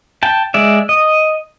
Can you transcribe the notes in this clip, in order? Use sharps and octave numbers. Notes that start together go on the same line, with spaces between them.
G5 A5
G#3 D5 E5
D#5